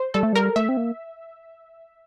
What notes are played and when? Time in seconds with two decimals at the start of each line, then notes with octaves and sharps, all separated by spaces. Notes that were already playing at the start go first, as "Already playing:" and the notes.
Already playing: C5
0.14 G3 A4
0.23 A3
0.33 G3 A#4
0.56 A3 E5
0.69 C4
0.77 A#3